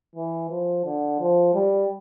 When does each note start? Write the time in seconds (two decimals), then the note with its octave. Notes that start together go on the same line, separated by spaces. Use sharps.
0.15 E3
0.50 F3
0.85 D3
1.20 F3
1.54 G3